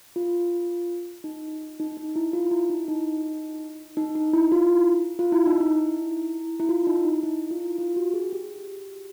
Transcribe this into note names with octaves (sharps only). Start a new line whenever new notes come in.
F4
D#4
D#4
D#4
E4
F4
E4
D#4
D#4
D#4
D#4
E4
F4
F4
E4
D#4
E4
E4
F4
D#4
D#4
E4
F4
F4
F#4
G#4
G4